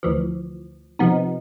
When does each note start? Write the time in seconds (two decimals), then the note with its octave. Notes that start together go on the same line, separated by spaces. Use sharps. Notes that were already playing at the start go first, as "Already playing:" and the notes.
0.03 D2 E3 F3
0.99 C3 F3 B3 D#4